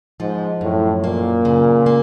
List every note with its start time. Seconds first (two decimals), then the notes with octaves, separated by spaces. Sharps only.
0.20 G#2 F3
0.61 F#2 A2
1.04 A#2 A#3
1.45 C#3
1.86 A#3